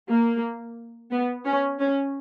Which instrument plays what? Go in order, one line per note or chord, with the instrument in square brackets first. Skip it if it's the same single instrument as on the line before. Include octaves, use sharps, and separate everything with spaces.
[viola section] A#3
B3
C#4
C#4